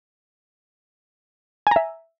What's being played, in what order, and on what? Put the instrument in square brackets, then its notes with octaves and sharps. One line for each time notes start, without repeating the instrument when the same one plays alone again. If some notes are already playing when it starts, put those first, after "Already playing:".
[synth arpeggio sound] G#5
A#5
E5